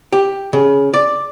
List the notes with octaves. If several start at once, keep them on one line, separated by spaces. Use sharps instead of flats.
G4
C#3
D5